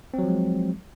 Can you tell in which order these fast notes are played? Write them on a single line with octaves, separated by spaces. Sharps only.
C4 F#3 F3 G#3